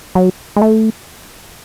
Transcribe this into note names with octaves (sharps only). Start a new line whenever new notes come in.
F#3
G#3
A3